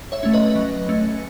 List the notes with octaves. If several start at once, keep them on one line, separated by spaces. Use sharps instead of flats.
C#5 E5
A3 C#4
B4 D#5
F#3
A3 C#4